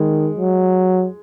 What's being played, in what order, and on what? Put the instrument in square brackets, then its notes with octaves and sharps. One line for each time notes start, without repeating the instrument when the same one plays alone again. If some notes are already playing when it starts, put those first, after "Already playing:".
Already playing: [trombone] D#3 [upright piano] G#3
[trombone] F#3